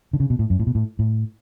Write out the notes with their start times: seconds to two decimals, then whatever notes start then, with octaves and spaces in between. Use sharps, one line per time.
0.13 D3
0.20 C#3
0.30 B2
0.39 A2
0.50 F#2
0.59 A2
0.67 B2
0.75 A2
0.99 A2